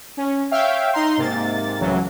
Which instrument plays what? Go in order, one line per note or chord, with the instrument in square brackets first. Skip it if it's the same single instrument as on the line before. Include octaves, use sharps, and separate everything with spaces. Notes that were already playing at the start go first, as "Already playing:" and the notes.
[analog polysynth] C#4
C#5 E5 F5 G5
D#4 A#5 C6
G#2 C3 A#3 A6
C#2 A2 C#3 E3 F#3